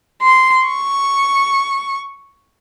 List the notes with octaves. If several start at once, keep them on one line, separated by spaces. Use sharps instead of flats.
C6
C#6